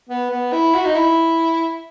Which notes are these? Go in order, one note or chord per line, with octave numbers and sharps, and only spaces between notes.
B3
B3
E4
F#4
D#4
E4